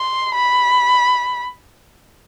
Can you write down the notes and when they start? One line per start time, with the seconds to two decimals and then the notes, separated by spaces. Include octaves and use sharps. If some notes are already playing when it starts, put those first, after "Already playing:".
Already playing: C6
0.35 B5